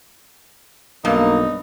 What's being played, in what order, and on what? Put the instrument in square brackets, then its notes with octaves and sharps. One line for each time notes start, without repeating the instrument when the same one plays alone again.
[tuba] B1 [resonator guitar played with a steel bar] G2 [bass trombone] A#3 [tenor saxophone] D#4